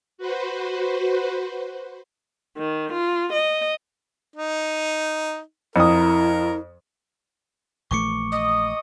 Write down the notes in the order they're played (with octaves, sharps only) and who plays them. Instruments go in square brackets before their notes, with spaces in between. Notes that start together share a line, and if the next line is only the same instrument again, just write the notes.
[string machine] F#4 B4 C5
[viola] D#3
F4
D#5
[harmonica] D#4
[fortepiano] F2 D#6 [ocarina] E4 [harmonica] A#4
[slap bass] A#1 E3 A3 [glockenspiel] C#6 D6 C#7
[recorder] D#5 [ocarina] D#6